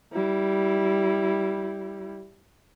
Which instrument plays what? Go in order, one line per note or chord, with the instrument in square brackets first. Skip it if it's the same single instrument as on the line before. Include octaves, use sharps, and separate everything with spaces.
[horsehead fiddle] G3 E4